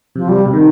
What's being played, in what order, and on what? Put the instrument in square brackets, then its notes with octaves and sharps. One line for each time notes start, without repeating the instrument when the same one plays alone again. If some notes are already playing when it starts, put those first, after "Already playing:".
[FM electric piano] C3 [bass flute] F3
[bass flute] G3
[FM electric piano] C3
[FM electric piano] D#3 [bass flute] D#4